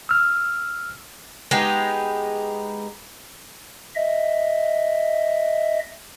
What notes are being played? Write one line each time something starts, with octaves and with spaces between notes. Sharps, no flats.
E6 F6
G#3 B3 D#4 G4
D#5 E5